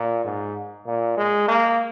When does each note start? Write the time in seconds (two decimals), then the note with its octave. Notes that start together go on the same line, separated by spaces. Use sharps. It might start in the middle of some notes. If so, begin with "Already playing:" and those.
Already playing: A#2
0.24 G#2
0.86 A#2
1.17 G#3
1.48 A#3